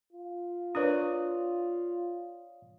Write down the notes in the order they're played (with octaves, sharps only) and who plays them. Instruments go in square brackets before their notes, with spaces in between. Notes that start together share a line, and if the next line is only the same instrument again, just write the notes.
[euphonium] F4
[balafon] D4 A#4 B4 [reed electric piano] C#5 D5 D#6